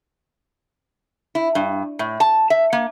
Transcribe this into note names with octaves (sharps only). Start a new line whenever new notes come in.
E4
G2
A2
A5
E5
A#3